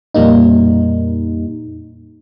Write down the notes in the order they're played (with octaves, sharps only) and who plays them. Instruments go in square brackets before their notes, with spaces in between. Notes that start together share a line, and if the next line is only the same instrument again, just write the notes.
[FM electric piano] F2 A#2 G3 A#3 D#4